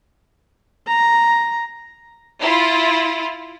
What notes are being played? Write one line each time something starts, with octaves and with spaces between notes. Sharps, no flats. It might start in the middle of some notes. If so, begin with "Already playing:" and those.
A#5
E4 F4